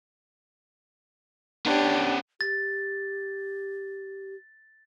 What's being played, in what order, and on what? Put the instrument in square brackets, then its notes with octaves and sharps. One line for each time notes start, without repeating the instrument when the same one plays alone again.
[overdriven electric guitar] B3 C#4 [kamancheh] D4 G4
[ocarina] G4 [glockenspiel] A6